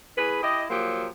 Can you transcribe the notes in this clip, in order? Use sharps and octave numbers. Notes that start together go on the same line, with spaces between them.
E2 G#4 B4
E4 G4 D#5
F3 F#3 A#3 G4